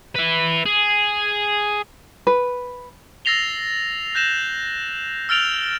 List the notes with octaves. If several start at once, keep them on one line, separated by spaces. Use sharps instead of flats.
B4 E5
G#4
B4
E6 A6 A#6 C7 F7 G7
F#6 G6 A#6 E7 F#7
E6 F6 A6 D7 F7 G7